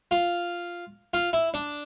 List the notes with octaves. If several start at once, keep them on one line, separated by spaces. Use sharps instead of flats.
F4
F4
E4
D4